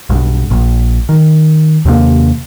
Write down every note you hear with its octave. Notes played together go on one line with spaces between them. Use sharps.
B1 G2
A#1 A#2
D#3
D#2 C3 E3 A#3